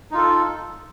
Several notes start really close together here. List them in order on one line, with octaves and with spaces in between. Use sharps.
D#4 F4 A4